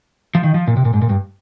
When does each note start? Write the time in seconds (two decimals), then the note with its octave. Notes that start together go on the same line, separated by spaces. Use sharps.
0.35 F3
0.44 D#3
0.54 F3
0.67 A#2
0.77 C3
0.85 A#2
0.94 G#2
1.02 A#2
1.10 G2